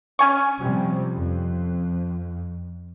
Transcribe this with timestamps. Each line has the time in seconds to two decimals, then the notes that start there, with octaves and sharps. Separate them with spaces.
0.19 C#4 G#5 C#6
0.61 C3 F3 G3
1.14 F2